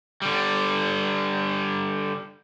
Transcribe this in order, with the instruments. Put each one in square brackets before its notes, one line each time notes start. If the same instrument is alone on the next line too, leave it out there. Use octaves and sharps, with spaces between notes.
[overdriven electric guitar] D3 G3